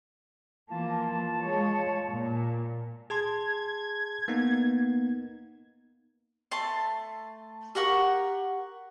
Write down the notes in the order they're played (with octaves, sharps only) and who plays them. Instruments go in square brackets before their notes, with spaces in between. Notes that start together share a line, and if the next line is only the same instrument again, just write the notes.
[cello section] E3 F3 A#3 [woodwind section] F4 A5
[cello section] G#3 C#5
A#2
[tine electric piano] G#4 A5 C6 [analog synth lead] G#6
[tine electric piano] A#3 B3 D#4
[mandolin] A3 A5 C6
G4 A#4 F#5 C#6